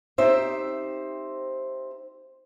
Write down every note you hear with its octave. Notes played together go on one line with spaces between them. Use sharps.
C4 D#4 G4 C5 E5